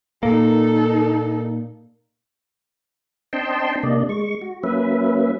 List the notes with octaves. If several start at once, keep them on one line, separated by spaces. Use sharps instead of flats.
A#2 A#3 D#4 A4
C4 D4 D#5 G5 A5 C6
C3 A#3 D4 D5 D#5
G#3 C#6
F#4
F#3 A#3 C#4 B4 E5